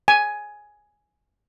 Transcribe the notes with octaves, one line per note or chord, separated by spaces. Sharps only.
G#5